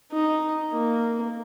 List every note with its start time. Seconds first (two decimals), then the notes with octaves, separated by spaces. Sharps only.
0.11 D#4
0.71 A#3